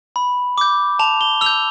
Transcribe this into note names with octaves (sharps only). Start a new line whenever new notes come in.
B5
D6 G6
A5 F7
G7
E6 F7
G6